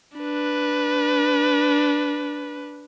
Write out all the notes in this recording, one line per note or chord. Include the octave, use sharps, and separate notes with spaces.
D4 B4